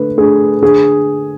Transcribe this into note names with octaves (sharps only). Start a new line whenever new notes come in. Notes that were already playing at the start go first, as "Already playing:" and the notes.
Already playing: D3 A3 B4
A3 D4 G#4
D3 G#4